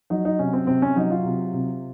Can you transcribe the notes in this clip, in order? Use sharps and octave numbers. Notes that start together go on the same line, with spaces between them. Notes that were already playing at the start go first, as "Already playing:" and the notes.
F#3 D#4
D#4
C3 C#4
C4
C3 C4
C#4
F#3 D#4
F4
C3
C3